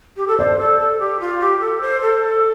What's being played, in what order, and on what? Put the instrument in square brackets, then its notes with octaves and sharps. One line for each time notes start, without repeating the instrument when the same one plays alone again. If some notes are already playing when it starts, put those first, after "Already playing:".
[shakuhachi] G4
A4
[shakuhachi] C5 [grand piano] D5
[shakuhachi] A4
A4
G4
F4
G4
A4
C5
A4